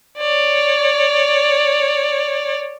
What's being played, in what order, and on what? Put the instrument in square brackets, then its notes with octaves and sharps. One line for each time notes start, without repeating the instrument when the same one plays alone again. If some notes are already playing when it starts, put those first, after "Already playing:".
[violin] C#5 D5